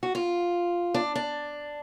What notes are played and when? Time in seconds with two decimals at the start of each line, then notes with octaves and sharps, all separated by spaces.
0.03 F#4
0.15 F4
0.94 D4
1.15 D4